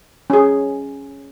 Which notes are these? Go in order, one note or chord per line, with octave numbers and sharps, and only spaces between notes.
C#4 G#4